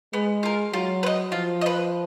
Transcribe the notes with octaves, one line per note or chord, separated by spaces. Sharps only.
G#3 B3
F4 A#4
F#3 F4
B4
D#5
F3 F4
D#5
B4